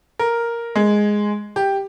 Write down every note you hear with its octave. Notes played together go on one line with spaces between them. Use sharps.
A#4
G#3
G4